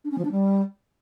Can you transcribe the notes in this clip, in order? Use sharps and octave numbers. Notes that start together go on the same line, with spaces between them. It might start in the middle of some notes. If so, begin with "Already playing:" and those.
D4
C#4
F3
D4
G3